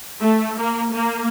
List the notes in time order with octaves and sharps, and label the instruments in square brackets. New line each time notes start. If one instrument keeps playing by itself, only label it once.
[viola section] A3
A#3
A#3